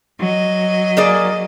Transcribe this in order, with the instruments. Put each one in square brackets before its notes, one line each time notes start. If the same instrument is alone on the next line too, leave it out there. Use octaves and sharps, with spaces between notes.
[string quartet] F#3 D#5
[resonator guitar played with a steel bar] A#3 G#4 D5